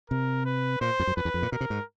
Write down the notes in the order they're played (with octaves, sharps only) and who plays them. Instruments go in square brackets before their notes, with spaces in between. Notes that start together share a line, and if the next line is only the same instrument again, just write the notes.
[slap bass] C3 [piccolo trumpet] A#4
[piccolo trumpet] B4
[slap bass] A#2 [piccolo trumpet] C5
[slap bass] F2
F#2
[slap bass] F2 [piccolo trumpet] B4
[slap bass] E2
F2
A#2
[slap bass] B2 [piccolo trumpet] A#4
[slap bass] C3
G#2